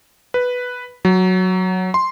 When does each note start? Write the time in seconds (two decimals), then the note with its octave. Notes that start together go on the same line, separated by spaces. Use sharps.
0.34 B4
1.05 F#3
1.94 C6